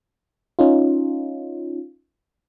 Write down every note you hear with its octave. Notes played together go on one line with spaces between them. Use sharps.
C#4 D#4 F4